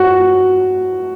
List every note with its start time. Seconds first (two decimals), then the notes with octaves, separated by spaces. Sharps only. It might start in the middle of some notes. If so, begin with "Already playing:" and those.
Already playing: F#4